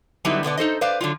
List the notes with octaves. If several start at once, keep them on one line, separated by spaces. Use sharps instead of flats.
D3 F#3 G3 B3 D#4 E4
B2 D3 B3 D5
D#4 A4 C5 D#5
B4 C5 D5 F5
D3 F#3 F4